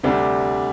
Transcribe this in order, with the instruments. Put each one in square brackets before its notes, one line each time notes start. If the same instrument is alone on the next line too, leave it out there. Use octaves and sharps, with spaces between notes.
[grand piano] D2 C3 G3 D4